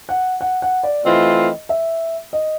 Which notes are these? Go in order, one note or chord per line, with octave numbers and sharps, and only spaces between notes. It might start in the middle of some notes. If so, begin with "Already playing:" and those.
F#5
F#5
F#5
D5
E3 A3 C4 F4 D#5
E5
D#5